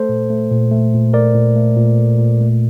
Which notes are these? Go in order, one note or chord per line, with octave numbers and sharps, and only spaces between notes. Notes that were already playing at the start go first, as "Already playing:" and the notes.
Already playing: A3 A4 C5
A#2
A3
A#2
A3
A#2
A3 A#4 D5
A#2
A3
A#2
A3
A#2
A3